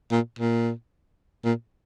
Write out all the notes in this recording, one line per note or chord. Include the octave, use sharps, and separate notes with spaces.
A#2
A#2
A#2